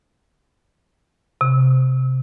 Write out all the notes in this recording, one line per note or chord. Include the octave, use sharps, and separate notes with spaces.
C3